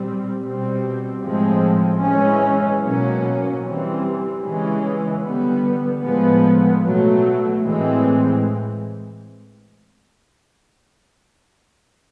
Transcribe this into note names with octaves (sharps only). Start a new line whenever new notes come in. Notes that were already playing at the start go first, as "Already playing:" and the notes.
Already playing: A#2 G3 C4
B2 G3 C4
A2 F3 G#3 C4
E3 G#3 C#4
B2 F#3 A#3 C#4
E3 G3 C4
C#3 E3 G#3 C#4
D3 G3 B3
A2 F3 G#3 B3
B2 F#3 A3
A2 E3 G#3 C4